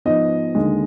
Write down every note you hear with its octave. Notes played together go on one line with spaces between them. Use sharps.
G#2 F3 B3 D#5
D#2 D3 G#3